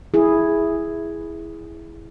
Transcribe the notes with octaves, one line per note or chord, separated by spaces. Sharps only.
E4 G#4